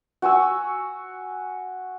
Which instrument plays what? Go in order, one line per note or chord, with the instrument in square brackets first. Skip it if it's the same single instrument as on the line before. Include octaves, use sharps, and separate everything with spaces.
[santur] F#4 G#5 C#6 E6